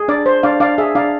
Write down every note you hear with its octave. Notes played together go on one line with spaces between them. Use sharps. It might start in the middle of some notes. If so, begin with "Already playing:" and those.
Already playing: G#4
D4 D5
C5
D4 D5 F5
D4 D5 F5
G#4 E5
D4 D5 F5